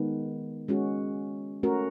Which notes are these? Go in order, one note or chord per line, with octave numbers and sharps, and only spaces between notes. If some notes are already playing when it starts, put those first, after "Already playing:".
Already playing: D#3 G#3 B3
G#3 C#4 F#4
A3 C#4 F#4 A#4